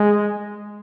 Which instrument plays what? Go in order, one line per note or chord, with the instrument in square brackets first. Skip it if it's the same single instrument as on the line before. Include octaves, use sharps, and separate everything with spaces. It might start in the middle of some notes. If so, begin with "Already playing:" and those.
Already playing: [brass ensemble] G#3